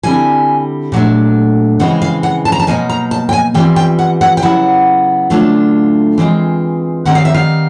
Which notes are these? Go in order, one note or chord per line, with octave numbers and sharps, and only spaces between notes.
D3 G3 C4 E4 G#5
A#2 F#3 A3 D4
C#3 E3 G#3 C4 F#5
F5
F#5
A5
A#5
A5
B2 F#3 A#3 D#4 G#5
A#5
A5
G5
G#5
E3 G3 C4 F4 G5
G5
F#5
F#5
G5
C#3 F#3 B3 E4 F#5
D3 F#3 A3 D4 F4
E3 G#3 C4 F4
D#3 G3 C4 D#4 F#5
F5
E5
F5